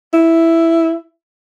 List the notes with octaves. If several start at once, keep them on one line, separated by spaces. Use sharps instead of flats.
E4